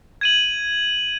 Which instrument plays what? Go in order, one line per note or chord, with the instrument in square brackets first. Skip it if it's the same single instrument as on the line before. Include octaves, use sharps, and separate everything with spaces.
[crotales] G#6 D#7 F#7